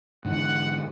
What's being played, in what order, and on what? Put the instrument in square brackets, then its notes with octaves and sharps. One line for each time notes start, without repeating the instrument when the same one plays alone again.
[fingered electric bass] G#2 D3 E3 [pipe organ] F#5